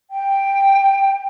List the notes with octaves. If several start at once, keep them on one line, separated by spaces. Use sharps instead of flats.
G5